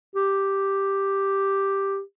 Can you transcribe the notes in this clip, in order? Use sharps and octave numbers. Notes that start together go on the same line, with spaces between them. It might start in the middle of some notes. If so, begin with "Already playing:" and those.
G4